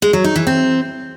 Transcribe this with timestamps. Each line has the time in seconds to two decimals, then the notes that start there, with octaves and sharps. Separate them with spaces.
0.02 G#3
0.13 F#3
0.24 D#4
0.36 E3
0.47 C4